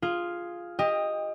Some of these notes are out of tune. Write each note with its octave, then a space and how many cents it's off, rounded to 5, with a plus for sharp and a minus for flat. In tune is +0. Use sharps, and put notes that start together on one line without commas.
F4 +0 G#4 +0
G4 +25 D#5 +0 G5 +35